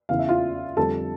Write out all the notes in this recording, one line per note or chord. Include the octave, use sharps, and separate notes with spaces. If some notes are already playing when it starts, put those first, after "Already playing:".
E2 C#3 E3 F5
E5
F4 F5
F2 D3 G3 A4 A5